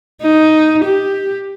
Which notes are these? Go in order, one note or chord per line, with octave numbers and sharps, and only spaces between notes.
D#4
G4